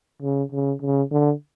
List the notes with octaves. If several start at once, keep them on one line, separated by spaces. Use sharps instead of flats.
C#3
C#3
C#3
D3